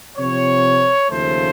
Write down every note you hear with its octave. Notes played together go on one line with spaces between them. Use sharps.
C3 F3 C4 C#5
D#2 C#3 F3 A3 C5